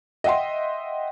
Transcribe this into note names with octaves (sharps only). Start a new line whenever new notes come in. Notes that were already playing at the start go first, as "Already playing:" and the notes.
D#5 E5 F#5 G5 C6